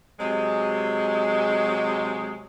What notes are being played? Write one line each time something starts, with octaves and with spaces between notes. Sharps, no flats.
C3 F#3 G#3